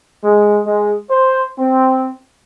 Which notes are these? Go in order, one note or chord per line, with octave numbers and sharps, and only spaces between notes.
G#3
G#3
C5
C4